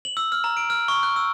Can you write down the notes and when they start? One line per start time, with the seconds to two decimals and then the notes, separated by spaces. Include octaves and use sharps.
0.05 F#7
0.17 E6
0.32 F6
0.44 A#5
0.57 D7
0.70 F6
0.88 C#6
1.03 F#6
1.16 E6